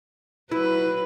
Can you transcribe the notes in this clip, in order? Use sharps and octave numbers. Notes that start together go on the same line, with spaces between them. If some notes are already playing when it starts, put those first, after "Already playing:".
F#3 E4 B4